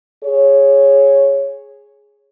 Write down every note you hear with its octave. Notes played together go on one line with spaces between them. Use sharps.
G#4 C#5